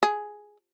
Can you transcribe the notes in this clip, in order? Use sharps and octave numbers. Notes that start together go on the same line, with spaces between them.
G#4